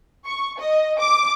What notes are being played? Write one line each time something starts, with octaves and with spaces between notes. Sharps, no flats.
C#6
D#5
D6